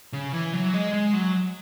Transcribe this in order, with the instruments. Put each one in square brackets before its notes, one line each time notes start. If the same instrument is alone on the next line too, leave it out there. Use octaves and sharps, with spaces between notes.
[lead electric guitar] C#3
E3
F#3
G#3
G#3
F#3